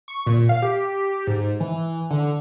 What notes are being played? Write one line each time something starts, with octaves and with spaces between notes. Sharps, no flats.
C#6
A#2
F5
G4
G#2
E3
D3